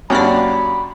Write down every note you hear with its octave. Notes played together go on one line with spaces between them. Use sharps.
F#2 A#3 D4 G4 C#5 D5 B5